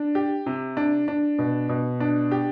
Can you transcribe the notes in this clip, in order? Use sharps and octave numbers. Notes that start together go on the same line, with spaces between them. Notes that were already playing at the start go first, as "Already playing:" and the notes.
Already playing: D4
G4
C3
D4
D4
B2
B2
D4
G4